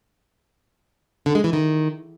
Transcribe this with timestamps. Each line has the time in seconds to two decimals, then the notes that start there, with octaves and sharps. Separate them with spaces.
1.26 D3
1.35 G#3
1.44 E3
1.53 D#3